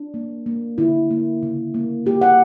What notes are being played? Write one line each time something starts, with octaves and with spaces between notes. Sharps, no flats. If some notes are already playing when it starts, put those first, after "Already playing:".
Already playing: D4
A#3
A#3
D3 E4
A#3
C#3
A#3
A#3 G4
F#5